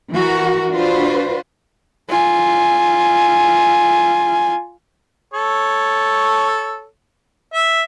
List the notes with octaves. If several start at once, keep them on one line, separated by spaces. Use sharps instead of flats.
E3 F#4 A#4
D4 F4 F#4 B4 C5
F4 G#5
A4 C#5
E5